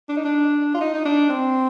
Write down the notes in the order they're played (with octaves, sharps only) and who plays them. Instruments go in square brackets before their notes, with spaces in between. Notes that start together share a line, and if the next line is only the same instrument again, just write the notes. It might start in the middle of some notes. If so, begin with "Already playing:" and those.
[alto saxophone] D4
D#4
D4
F4
D#4
D#4
D4
C4